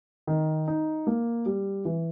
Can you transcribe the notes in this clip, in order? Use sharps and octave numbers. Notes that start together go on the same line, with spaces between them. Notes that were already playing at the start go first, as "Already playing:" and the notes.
D#3
D#4
A#3
G3
E3